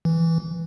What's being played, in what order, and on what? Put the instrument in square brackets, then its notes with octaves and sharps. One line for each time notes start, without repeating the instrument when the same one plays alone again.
[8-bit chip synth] E3